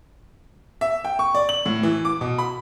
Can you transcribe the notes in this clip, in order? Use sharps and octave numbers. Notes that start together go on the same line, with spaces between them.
E5
G5
C#6
D5
F#7
A2
E3
D6
B2
B5